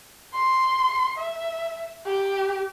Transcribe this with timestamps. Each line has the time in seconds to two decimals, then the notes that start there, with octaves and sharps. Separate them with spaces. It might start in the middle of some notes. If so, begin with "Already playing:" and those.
0.34 C6
1.18 E5
2.06 G4